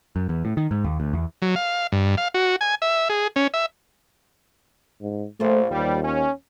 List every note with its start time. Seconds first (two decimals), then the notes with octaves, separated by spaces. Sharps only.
0.16 F#2
0.29 E2
0.45 A2
0.57 D#3
0.71 G#2
0.84 D#2
1.00 D2
1.13 E2
1.42 F#3
1.56 F5
1.92 G2
2.17 F5
2.34 F#4
2.61 G#5
2.82 E5
3.09 G#4
3.36 C#4
3.54 E5
5.02 G#2
5.40 A#1 A3 F4 C5
5.71 D#2 G3
6.04 C#4